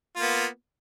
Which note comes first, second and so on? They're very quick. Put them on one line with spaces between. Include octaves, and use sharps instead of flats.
F4 A#3 B3